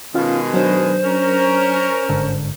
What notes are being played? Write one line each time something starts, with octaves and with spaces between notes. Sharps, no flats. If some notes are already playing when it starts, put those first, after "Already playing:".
B2 D#3 G#3 C#4 F4 F5
F#3 D4 C5
C#4 A#4
G1 G#2 D3